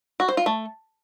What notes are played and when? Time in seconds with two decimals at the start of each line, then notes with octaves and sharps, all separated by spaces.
0.20 F#4
0.29 C5
0.37 F4
0.46 A3